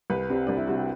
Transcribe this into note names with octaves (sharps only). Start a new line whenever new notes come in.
C2 B4
C3 G3 C4
C2 D4
E4
C3 G3 C4 F#4
G4